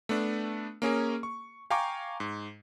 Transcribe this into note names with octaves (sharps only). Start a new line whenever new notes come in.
A3 B3 D4
A#3 C#4 G#4 A#4
C#6
F5 G5 G#5 A#5 C#6 D6
G#2